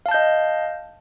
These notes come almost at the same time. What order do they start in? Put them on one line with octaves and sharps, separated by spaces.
F5 A5 G6 D#5